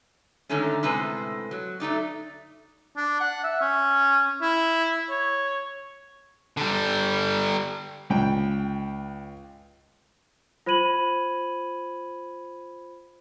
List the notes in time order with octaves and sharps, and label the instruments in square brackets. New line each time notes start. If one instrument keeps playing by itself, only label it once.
[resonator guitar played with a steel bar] G#2 D3 D#3 A3 C#4
A2 C3 G#3 B4 C5
F#3
F#3 A3 D#4 D5
[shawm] D4
F#5
E5
C#4
E4
C#5
[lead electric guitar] D3 G3
[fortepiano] C#2 G5
[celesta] F4 C5 B5 G#6 D#7 F#7